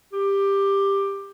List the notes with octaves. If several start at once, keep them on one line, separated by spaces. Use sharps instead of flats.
G4